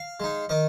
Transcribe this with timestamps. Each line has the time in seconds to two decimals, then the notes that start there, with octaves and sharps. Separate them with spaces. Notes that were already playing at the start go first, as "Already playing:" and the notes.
Already playing: F5
0.20 G#3 D#4
0.49 D#3 D#5